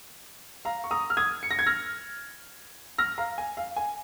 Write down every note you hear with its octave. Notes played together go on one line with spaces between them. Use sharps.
F5 A#5
C#6
A#5 D#6
F6
D#6 G#6
C#7
A#6
G#6
F6 A#6
F6 A#6
F5 A#5
G#5
F5
G#5